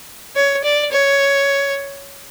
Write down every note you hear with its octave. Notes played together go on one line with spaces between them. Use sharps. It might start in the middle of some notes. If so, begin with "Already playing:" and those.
C#5
D5
C#5